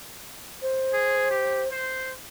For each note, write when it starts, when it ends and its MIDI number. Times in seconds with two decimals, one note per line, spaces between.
0.62 1.69 72
0.93 1.26 68
1.30 1.62 67
1.71 2.11 72